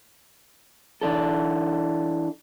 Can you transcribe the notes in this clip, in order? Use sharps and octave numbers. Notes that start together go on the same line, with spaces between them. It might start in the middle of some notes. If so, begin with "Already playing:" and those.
E3 D4 A4